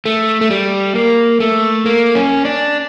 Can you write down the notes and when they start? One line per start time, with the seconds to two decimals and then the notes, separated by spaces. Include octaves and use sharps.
0.06 A3
0.41 A3
0.51 G3
0.95 A#3
1.40 A3
1.86 A#3
2.15 C#4
2.45 D4